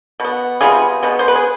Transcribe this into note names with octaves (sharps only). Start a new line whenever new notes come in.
B2 B3
C3 G3 B3 F4 G#4
B2 G#3 B3
C5
B4
G#4